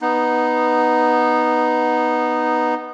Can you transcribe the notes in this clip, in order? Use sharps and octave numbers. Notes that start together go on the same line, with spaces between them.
B3 D#4